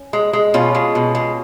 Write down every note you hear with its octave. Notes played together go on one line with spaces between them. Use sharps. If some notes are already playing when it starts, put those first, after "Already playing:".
Already playing: C#4
G#3
G#3
B2 C#4 F4
G#3
B2
G#3